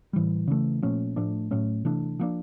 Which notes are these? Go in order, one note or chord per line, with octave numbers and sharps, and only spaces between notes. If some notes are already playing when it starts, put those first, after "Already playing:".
A2 E3 G3
C#3 E3 A3
A#2 F3 A3 C#4
A2 F3 A3 D4
A2 F#3 A3 C#4
C3 E3 A3 D4
F3 A#3 D4